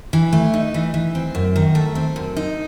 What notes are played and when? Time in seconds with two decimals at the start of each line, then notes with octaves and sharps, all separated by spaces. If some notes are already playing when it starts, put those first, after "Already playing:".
0.13 E3
0.33 A3
0.53 D#4
0.74 E3
0.94 E3
1.15 C4
1.35 F#2
1.56 D#3
1.75 A3
1.95 C4
2.16 F#2
2.36 D#4